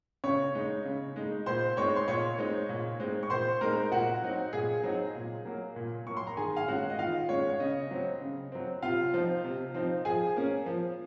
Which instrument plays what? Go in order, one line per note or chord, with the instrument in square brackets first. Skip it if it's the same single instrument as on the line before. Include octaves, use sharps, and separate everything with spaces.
[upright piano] C#3 C#5 C#6
G#3 D#4
C#3
G#3 D#4
A#2 C5 C6
G#3 C4 D#4 C#5 C#6
C6
A#2 C#5 C#6
G#3 C4 D#4
A#2
G#3 C4 D#4
C#6
A#2 C5 C6
G#3 C4 D#4 A#4 A#5
A#2 F#4 F#5
F#3 C4 D#4
A#2 G#4 G#5
F#3 C4 D#4
A#2
F#3 A#3
A#2
F#3 A#3 C#6
C6
A#5
D#3 G#4 G#5
F5
G#3 C#4 F#4 F#5
D#5
D#3 F4 F5
G#3 C#4 C#5
C#5
C#3 D#5
F#3 C4
C#3
F#3 C4
C3 F4 F5
F3 C4 D#4
C3
F3 C4 D#4
F3 G#4 G#5
A#3 C#4
F3